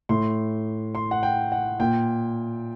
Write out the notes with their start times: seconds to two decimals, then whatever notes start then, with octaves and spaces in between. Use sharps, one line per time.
0.09 A2 C6
0.95 C6
1.11 F#5
1.23 G5
1.52 F#5
1.79 A#2 G5